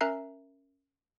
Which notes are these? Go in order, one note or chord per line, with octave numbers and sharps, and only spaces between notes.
C#4 A#4 E5 A#5 F#6 C7